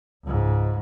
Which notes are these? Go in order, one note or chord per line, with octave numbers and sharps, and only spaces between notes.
C#2 G#2